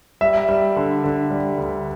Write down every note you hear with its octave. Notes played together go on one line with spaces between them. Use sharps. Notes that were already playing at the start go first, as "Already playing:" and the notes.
G3 E5
G3
D3
D3
G3
D2